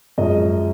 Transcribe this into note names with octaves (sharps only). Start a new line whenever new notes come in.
F#2 F3 G#3 D#5